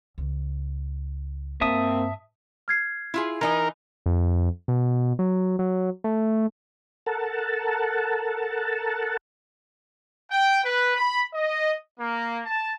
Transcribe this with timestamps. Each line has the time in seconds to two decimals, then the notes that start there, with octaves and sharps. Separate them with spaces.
0.18 C#2
1.61 G2 A#3 C4 E5 A5 D#6
2.68 F6 G#6 C7
3.14 E4 F4 G#4
3.41 E3 D#4 A#4 D#5
4.06 F2
4.68 B2
5.19 F#3
5.59 F#3
6.04 A3
7.06 A4 A#4 F#5 A5
10.31 G5
10.64 B4
10.97 B5
11.34 D#5
12.00 A#3
12.45 A5